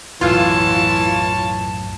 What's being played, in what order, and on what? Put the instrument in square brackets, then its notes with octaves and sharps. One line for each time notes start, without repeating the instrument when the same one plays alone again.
[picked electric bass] B1 F#2 A2 [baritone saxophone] E3 [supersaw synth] F4 [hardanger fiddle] C#5 A5